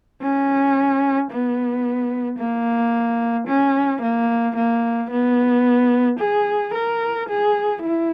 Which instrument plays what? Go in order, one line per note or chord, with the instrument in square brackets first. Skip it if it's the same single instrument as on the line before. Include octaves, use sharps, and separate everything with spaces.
[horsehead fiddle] C#4
B3
A#3
C#4
A#3
A#3
B3
G#4
A#4
G#4
E4